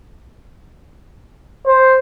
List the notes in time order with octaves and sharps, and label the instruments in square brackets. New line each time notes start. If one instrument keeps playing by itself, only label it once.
[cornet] C5